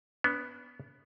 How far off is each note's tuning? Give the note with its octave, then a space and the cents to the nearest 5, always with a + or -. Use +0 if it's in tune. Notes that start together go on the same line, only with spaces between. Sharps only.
B3 +0 D4 -40